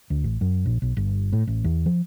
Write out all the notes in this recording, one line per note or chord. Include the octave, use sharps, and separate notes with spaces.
D2
A1
F#2
A#1
B1
G1
A2
A1
E2
F3